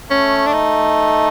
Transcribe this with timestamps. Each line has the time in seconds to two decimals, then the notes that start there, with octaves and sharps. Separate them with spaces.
0.10 A3 C#4
0.47 D4
0.53 D#4